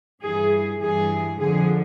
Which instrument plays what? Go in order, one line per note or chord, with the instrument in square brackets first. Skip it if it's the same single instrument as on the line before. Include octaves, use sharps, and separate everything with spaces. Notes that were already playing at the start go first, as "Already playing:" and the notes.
[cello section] G2 E3 G#4
G2 E3 G#4
F2 D3 F3 G#4